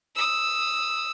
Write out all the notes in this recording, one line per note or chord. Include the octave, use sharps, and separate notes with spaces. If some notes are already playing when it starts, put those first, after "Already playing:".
D#6 E6